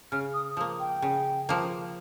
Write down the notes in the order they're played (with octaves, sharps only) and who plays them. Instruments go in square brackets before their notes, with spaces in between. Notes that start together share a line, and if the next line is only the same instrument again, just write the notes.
[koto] C#3 [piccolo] F6
[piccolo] D#6
[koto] F3 [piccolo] D#6
[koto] A#3
[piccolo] G5
[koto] C#3
F3 A#3